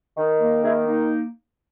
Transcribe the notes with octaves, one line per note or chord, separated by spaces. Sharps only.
D#3
A#3
D#3 E4 G#4
A#3 D#4